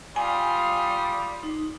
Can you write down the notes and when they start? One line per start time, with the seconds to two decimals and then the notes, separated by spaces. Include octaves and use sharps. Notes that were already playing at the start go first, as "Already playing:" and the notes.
0.16 G3 F4 G#5 D#6
1.43 D#4